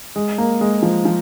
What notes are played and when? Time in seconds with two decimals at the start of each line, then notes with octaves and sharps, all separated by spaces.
0.16 G#3
0.38 A#3
0.61 G#3
0.82 F3
1.05 F3